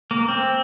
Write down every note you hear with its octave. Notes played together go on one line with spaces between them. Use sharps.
A#3
C4